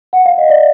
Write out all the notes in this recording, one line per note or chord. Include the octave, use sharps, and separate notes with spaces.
F#5
F5
D#5
D5